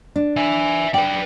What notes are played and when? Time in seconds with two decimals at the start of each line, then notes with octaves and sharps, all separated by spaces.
0.16 D4
0.36 E5 G#5
0.94 B4 D5 G5